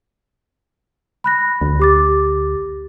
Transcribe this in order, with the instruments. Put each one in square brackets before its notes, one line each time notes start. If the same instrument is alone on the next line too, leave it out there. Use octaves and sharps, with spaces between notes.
[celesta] B5 F#6 A#6
[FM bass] D2
[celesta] G4 D6 A6